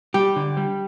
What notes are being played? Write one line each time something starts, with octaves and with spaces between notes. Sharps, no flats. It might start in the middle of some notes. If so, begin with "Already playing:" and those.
G3 G4
D3
G3